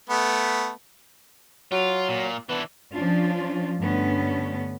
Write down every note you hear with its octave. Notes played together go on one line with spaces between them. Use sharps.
A3 B3
F#3 F4
A#2
E3 B3 D4
F3 C#4 D4 F4
G2 D3 A3 B3 C#4 D4